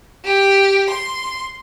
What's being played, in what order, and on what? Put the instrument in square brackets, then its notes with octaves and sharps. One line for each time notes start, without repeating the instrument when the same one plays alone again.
[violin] G4
C6